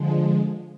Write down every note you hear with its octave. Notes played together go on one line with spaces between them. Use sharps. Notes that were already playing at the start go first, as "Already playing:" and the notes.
Already playing: D3 F3 G#3